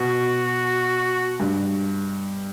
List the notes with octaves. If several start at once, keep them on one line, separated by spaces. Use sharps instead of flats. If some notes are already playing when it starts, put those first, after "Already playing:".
Already playing: B2 F#4
G2